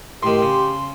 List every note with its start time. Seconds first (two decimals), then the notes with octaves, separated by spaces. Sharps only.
0.23 A2 D#3 G4 C6
0.42 C#3